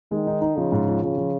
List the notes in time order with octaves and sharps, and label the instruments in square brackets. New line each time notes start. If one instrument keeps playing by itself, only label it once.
[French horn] D#3 [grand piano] G#3
[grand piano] D#4
D#4
[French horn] C#3 [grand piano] F3
[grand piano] G#2
F3
[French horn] C#3 [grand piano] F3
[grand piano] F3